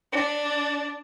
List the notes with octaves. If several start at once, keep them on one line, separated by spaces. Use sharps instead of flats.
D4